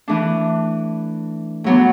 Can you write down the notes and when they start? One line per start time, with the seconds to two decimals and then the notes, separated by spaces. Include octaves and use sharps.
0.08 E3 A3 D4
1.64 A2 F#3 B3 D4